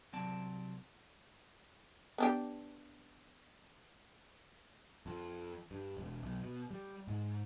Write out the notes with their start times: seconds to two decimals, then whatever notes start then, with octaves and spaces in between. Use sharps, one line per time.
0.12 C2 F#3 C4 D5 A5
2.18 B3 D4 G4
5.06 F2
5.71 G2
5.97 E1
6.23 B1
6.43 B2
6.71 G3
7.07 G#2